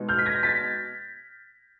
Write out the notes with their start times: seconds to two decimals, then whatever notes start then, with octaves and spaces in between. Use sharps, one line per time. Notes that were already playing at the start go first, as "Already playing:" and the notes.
Already playing: B2 G#3 B3 D#4
0.09 F6 G6
0.19 B6
0.26 G#6 A#6
0.43 A6 B6